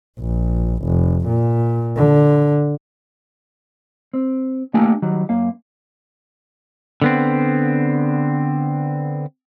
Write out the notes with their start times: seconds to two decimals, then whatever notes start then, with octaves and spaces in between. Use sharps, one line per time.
0.19 A#1
0.84 F1
1.27 A#2
1.97 D3
4.14 C4
4.74 A3 A#3 D4 G4 G5 G#5
5.02 D#3 F#3 G3
5.29 F#2 A#3 F5
7.02 D3 B3 C4